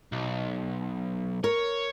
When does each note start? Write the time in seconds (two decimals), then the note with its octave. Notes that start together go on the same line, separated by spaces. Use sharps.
0.12 B1
1.44 A#4 C#5